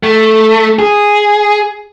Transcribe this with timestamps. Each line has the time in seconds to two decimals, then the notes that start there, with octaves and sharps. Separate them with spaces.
0.03 A3
0.79 G#4